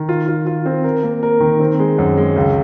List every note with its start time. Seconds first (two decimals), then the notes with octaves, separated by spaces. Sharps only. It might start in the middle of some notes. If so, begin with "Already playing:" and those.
Already playing: D#3
0.09 F4
0.28 F4
0.47 F4
0.66 C4
0.84 A#4
1.03 A#3
1.23 A#4
1.40 D#3
1.60 C4
1.79 G#3
1.99 F#2
2.17 G#3
2.36 C#2